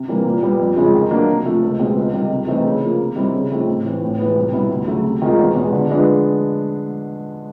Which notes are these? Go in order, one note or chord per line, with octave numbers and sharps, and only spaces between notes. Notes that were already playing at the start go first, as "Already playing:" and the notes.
Already playing: C3
E3 G3 A#3
A#2
G3 B3
F2
C#3 F3 G#3
D#3
F#3 A#3 D4
C3
F3 A3
C#2
B2 G#3 C4
C#2
C3 D#3 G3
C3
E3 A3 C4 D#4
C#3
F3 A#3
C3
D#3 G3 C4 E4
C#3
F3 A3 C4 D#4
A2
E3 A3 C4
A2
E3 G#3 B3
C2
B2 G3 B3 E4
D2
C#3 F#3 A3
C3
D#3 G#3 C4 F4
E2
B2 G#3
D3
F3 G#3 B3 D4